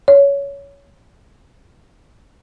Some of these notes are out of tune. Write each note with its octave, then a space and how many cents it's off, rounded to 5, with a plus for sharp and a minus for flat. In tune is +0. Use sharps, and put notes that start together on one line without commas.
C#5 +15